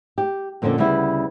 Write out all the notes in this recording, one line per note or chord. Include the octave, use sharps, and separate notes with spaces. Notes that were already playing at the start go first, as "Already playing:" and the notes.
G4
F2 A#2 D3 C#4 A4 D#5
D2 C#3 G3 B3 E4 F#5